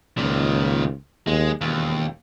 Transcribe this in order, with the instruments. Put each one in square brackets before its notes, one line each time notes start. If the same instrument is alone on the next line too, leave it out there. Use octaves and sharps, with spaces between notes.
[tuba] C#2 [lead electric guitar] A#2 D#3
[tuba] D#2 [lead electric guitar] G#3
[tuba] E1 [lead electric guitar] D#2